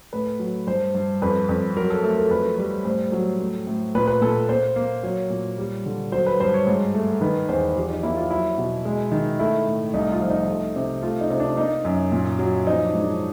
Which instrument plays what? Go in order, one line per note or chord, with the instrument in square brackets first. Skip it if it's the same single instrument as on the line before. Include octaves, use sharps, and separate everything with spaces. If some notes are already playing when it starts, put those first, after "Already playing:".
[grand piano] A2 B4
F#3
G2 C5
G2
F2 B4
F2
F#3 A#4
A4
A3 A4
A#4
F2 B4
G3
A2 C5
F#3
A2
A2
A#2 B4
B4
A#2 A4
A#3 C5
A#3
F#3 C#5
A#2
G3
D3
F#3 C5
B4
G2 C5
C#5
G#2
A3
D#3 B4
E2 C5
F3 G4
D#4
A#3 E4
F4
F#3 E4
B2
G#3
D#3
A3 E4
A2
C2 D#4
F4
F3
D#4
A3
C3
A3 F4
D#4
C3
D4
A#3 D#4
F#2
A#2
F#3
F3 D#4
D4
G#2
D4